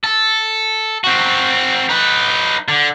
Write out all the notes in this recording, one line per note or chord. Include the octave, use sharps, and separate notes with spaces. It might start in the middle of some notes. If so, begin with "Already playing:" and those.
A4
C4 F#4
D#4 B4
D3